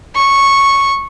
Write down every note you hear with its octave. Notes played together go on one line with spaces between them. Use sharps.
C#6